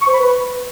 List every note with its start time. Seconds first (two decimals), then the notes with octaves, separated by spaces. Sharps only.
0.01 C#6
0.07 C5
0.13 B5
0.19 B4